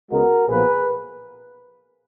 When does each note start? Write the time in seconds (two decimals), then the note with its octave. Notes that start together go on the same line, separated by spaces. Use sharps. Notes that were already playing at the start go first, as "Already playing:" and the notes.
0.11 C#2 C#3 G#3 B3 F#4 A#4
0.48 B1 A#2 F3 B3 G#4 B4